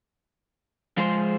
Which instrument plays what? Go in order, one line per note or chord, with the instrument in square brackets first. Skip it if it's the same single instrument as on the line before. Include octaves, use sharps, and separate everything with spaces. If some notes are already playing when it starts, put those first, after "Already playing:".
[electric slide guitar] F3 G#3 F4 G#4 C5